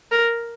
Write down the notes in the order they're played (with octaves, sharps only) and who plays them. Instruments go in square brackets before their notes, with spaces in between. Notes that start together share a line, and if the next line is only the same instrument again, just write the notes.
[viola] A#4